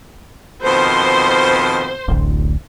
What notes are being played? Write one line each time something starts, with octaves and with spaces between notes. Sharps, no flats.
F2 B2 D#3 C5
D1 A1 D2